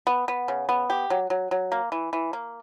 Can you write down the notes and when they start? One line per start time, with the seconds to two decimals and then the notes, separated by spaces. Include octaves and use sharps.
0.07 B3
0.28 B3
0.48 C#3
0.69 B3
0.90 G4
1.10 F#3
1.30 F#3
1.51 F#3
1.72 A#3
1.92 E3
2.13 E3
2.33 A#3